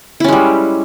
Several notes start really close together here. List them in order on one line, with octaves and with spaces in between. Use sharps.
E4 C#4 G#3 G3